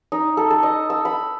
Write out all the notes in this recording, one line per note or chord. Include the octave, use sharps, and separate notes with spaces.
D#4
A4
A4
D#5
E6
B5